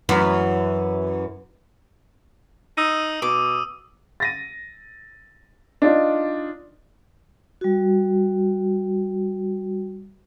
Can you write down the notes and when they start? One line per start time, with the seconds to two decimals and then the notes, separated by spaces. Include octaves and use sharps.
0.09 F#2 E3
2.77 D#4 D#6 E6 D#7
3.22 B2 D6
4.20 A6 A#6 D#7
5.82 D4 D#4 F4 D5
7.61 G3 F#4